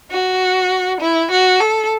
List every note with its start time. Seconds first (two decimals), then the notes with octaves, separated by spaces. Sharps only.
0.11 F#4
1.01 E4
1.31 F#4
1.60 A4